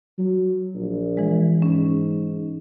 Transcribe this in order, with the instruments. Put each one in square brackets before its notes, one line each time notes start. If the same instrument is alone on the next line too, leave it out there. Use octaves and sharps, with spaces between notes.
[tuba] F#3
A#1
[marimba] E3 G#3
[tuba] G#2 [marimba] C#4